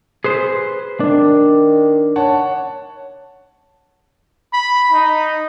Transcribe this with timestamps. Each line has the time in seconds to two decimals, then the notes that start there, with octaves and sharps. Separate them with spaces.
0.24 G#4 B4 C5
1.00 D#3 D4
2.16 C#5 F#5 A5
4.53 B5
4.92 D#4